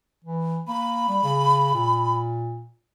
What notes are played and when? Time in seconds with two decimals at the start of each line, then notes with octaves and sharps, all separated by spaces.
0.24 E3
0.67 A#3 B5
1.09 G3
1.24 C#3
1.74 A#2